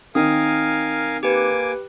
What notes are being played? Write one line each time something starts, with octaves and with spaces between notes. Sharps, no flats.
D#3 C4 A#4 F5 G#5 D#6
A#3 G4 B4 G#5 D6